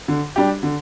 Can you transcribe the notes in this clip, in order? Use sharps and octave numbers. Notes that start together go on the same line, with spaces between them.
D3
G3 D4 G4
D3